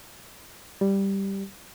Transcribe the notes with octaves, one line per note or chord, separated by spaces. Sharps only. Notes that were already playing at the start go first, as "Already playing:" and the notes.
G3